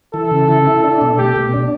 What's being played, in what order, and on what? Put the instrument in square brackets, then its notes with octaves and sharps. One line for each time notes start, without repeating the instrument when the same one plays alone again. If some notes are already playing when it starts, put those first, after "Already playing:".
[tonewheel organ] E3 [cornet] A4
[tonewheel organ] C#3
E4
E4
[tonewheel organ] D4 [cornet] A4
[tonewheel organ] B2
[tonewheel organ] A3 [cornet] G4
[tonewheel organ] B2
D4